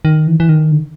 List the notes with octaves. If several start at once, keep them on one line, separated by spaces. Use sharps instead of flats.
D#3
E3
E3
D#3
D3